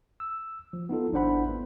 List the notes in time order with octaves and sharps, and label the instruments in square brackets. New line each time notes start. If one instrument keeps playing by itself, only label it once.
[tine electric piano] E6
F3
B3 D#4 F4 A4
G#1 D4 E4 C5 F#5 B5
B3